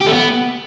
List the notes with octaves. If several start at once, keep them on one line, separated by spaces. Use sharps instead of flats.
G4
A3
B3